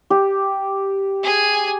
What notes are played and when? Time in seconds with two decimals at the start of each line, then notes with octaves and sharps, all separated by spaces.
0.10 G4
1.24 G#4 G#5